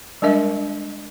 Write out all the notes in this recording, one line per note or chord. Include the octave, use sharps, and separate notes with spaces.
G3 G#3 D4 A#4 D#5 E5